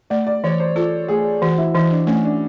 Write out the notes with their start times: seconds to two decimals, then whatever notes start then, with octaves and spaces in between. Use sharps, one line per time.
0.10 A3 D5
0.27 D5
0.44 E3 C#5
0.60 C5
0.76 F4 A4
1.08 A3 G#4
1.42 E3 F#4
1.58 E4
1.74 E3 D#4
1.91 D4
2.07 A3 C#4
2.24 D4